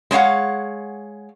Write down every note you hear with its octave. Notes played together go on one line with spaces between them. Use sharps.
G#3 C5 C#5 F5 F#5